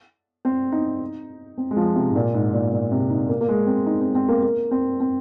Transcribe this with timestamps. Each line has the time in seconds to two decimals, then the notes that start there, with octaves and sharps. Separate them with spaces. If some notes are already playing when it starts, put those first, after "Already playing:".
0.45 C4
0.72 D#4
1.58 C4
1.71 G#3
1.77 F3
1.95 C3
2.09 G#2
2.16 A#2
2.34 G#2
2.53 A#2
2.72 A#2
2.91 C3
3.10 D#4
3.29 A#3
3.41 A#3
3.49 G#3
3.66 C4
3.86 D#4
4.01 C4
4.15 C4
4.29 A#3
4.42 A#3
4.71 C4
5.00 C4